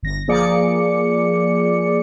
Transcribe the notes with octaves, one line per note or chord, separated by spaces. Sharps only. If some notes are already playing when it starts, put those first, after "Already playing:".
G1 A#6
F3 A#3 G#4 D5 D6 C#7